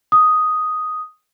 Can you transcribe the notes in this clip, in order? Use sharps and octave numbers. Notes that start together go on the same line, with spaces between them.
D#6